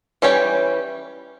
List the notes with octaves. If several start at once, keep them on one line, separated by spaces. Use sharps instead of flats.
E3 G3 C#4 G4 C#5